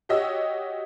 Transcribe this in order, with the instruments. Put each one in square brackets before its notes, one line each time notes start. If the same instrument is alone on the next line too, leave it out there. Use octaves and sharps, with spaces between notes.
[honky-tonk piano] F#4 G4 C#5 D#5 E6